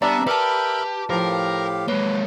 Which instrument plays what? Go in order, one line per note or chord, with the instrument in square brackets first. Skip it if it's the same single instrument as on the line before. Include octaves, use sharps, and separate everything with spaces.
[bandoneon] G3 D4 E5 [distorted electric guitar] B3 [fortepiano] D5 [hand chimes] A#5
[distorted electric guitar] G4 [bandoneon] A#4 E5 B5 [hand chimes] B4 A5
[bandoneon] A2 G4 F5 [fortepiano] F3 [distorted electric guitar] A#4
[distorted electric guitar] G#3 A#3 [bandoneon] B4 [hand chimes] C#5